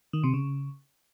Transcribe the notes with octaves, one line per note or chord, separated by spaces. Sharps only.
D#3
C3
C#3